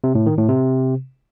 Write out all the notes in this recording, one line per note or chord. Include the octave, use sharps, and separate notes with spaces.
C3
A2
D#3
A2
C3